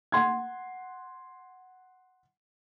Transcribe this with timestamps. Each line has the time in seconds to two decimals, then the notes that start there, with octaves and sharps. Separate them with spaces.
0.12 F#5 C6 G#6